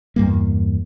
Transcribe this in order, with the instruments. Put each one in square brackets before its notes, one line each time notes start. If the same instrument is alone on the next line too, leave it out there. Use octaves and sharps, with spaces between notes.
[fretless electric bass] E2 G2 G3 A#3